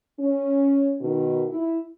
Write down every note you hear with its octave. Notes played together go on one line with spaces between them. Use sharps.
C#4
B2 D#3
E4